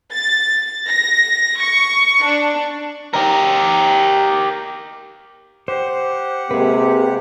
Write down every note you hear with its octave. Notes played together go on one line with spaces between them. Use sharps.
A6
A#6
C#6
D4
G4 A#4
G4 C5 F#5
C3 G#3 A#3 G#4 B4